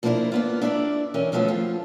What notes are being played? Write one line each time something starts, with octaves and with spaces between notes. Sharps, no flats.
F3 A#3 B3 D4 E4 A#4
A#3 B3 F4
D4 E4 B4 C#5 D5
E3 C#4 E4 A#4
D#2 F3 F#3 A3 B3
F3 F4